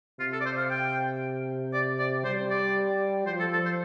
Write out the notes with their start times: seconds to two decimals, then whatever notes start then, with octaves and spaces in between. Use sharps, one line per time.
0.19 C3 F4
0.32 A4
0.40 D5
0.45 C5
0.58 F5
0.70 G5
1.73 D5
1.99 D5
2.24 G3 C5
2.50 D5
3.26 F3 C5
3.39 A4
3.52 A4
3.65 C5